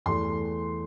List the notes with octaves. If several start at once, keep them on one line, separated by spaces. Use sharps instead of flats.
E2 E3 A3 C6